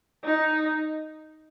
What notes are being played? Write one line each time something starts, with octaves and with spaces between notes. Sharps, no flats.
D#4